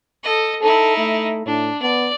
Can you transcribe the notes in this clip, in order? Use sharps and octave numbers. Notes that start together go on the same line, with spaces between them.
A4 D#5
D#4 E4 A4
A3
A2 D4
B3 D5